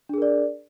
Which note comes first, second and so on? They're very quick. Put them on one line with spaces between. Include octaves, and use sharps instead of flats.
D4 G#4 A#4 D5